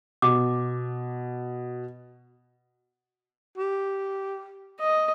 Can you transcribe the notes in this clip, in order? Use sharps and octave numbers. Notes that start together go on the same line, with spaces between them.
B2 D6
G4
D#5